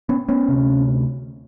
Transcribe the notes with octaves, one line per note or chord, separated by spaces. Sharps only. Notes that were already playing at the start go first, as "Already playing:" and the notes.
B3 C#4
B3 C#4
D2 C3